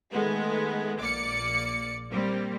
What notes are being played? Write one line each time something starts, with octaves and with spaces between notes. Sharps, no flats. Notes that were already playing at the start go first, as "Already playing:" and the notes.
D#3 G#3 A3 B3
A#1 A#3 D5 D6 C#7
G3 A#3 C4